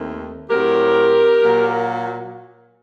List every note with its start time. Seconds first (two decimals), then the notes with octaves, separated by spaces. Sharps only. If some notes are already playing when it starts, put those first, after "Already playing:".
Already playing: D#2 D#3 A3 C4
0.49 A2 F#3 C4 G4 A#4
1.41 A#2 F#3 A#3